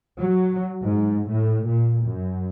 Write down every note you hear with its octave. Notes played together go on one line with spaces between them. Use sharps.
F#3
G#2
A2
A#2
F#2